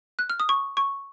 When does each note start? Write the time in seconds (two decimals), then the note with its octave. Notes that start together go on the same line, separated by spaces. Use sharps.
0.19 F#6
0.30 F6
0.40 D#6
0.49 C#6
0.77 C#6